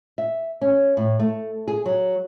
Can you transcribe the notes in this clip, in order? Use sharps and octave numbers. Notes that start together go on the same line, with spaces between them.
E5
C#4
A2
A3
G#4
F#3